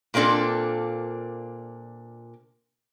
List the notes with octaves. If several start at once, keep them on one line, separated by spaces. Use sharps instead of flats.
A#2 A#3 C4 D4 A4